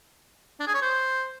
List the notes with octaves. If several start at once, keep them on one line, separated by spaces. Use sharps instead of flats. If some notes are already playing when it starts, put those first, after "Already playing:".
D4
G#4
C#5
C5